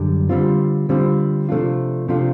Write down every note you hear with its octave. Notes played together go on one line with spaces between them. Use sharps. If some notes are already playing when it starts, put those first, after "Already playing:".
Already playing: F#2 D3 G3
D3 G3 C4 F4
D3 G3 C4 F4
C3 F3 A3 D4 F4
C3 F3 A3 D4 F4